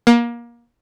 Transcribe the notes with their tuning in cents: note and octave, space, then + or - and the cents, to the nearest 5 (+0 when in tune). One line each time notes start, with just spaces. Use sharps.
A#3 +25